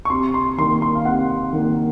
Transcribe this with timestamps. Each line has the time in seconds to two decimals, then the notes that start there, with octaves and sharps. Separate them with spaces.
0.05 C#6
0.10 C3 C6
0.34 C6
0.58 D#3 A#3 C6
0.82 C6
0.95 F5
1.05 C3 F#5
1.53 D#3 A#3